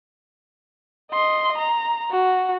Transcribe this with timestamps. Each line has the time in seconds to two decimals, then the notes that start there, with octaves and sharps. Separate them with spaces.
1.12 D#5 C6
1.58 A#5
2.11 F#4